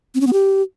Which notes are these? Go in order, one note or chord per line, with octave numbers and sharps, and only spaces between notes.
C4
C#4
B3
G4